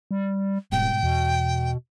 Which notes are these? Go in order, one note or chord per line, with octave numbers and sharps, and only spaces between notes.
G3
D1 G#2 B2 G3 G5
E2 B2